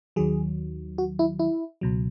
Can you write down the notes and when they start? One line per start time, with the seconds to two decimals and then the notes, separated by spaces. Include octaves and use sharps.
0.16 D#2 D#3 F#3 G#4
0.98 F#4
1.19 E4
1.39 E4
1.81 C#2 B2 F#3